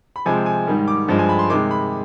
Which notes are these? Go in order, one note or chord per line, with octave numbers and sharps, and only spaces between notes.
B5
C3 F3 G#3 G#5
G#5
G#2 D#3 G3
D6
G2 F3 G#3
G#5
B5
C6
C3 D#3 G#3 D6
B5